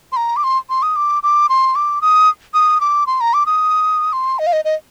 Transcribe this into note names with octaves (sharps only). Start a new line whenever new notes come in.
C6
A#5
D6
C6
C6
D#6
D6
D6
C6
D6
D#6
D#6
D6
C6
A#5
D6
D#6
C6
D#5
F5
D#5
D#5